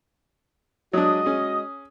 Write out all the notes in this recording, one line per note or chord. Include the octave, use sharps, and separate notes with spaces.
F#3 G#3 D4 F#4 D#5 D#6
C#4 G#4